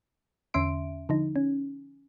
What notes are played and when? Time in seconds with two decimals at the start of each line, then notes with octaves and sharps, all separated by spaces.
0.54 E2 D3 C#4 E5 C6 D7
1.09 D3 F3 D#4
1.36 C#4